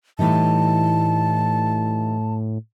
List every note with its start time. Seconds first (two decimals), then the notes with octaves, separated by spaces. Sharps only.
0.19 A2 E3 G3 D#4 A5